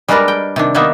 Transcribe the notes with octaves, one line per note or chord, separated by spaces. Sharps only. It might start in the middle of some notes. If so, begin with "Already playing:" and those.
G3 G#3 D4 A#4 B4 D5
G5
C3 D#3 D4
D#3 A#3 B3 D#4 E5